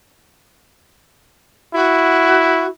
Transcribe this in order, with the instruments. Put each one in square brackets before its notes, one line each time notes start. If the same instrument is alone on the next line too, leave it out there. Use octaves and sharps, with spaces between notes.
[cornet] E4 [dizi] F#4